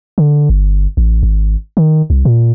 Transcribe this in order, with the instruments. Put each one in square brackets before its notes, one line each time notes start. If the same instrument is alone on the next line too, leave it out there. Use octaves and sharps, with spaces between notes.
[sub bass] D3
G1
A1
G#1
D#3
C2
A#2